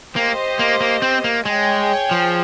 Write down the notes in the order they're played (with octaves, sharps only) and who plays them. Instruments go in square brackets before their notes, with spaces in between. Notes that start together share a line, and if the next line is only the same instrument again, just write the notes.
[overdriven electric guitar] A#3 [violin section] G4 C5 D#5
[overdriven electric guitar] A#3
A#3
C4
A#3
[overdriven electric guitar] G#3 [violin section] G#4 C#5 G5
[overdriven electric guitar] F3